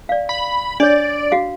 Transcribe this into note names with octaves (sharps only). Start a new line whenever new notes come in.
D5 F5
B5
D4 C#5 D5
F#4 F5